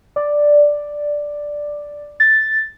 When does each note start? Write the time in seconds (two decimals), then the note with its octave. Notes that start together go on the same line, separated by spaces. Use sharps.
0.16 D5
2.20 A6